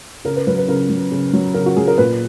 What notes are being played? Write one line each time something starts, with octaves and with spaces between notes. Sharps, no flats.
C#3 A#4
B4
F#3 B4
B4
C#3 A#4
F#3
C#3
F#3
C#3 A#4
F#4
F#3 G#4
A#4
A#2 B4